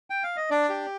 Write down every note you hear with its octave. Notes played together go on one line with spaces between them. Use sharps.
G5
F5
D#5
D4 D5
G4